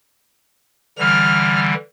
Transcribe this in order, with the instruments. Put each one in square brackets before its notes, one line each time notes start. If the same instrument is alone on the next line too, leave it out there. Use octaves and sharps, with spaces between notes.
[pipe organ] D3 E3 G3 [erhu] F6